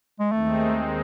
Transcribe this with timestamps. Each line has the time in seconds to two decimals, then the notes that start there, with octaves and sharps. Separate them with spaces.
0.20 G#3
0.32 D#2 D#3 G#3 A3 C4 D#4